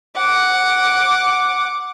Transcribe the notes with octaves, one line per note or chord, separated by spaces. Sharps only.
F#5 D6